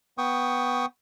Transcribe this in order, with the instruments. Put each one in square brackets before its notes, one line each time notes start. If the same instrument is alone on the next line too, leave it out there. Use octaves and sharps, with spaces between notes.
[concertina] B3 G5 C#6 D#6